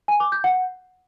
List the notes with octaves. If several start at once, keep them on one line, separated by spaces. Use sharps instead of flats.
G#5
D6
G6
F#5